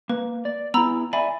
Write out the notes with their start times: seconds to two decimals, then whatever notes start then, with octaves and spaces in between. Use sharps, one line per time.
0.09 A#3 B4
0.45 D5
0.74 B3 E4 A#5 B5 E6
1.13 D5 E5 G#5 B5